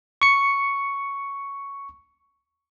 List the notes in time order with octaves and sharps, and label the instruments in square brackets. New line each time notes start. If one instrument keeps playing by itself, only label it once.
[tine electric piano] C#6 C#7